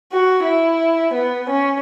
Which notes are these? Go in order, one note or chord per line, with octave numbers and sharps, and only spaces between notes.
F#4
E4
B3
C#4